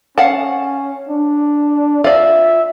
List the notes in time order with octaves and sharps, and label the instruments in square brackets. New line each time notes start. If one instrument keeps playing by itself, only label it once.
[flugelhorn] C#4 [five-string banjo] F5 F#5 A5
[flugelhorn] D4
[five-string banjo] F4 D5 [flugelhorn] E5